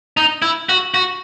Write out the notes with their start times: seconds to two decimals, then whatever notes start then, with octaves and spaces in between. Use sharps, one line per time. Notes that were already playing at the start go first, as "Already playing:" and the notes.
0.17 D#4
0.42 E4
0.69 F#4
0.94 F#4